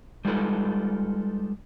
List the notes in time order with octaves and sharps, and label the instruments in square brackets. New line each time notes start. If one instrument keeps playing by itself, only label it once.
[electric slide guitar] G3 G#3 D#4 F4 A4 B4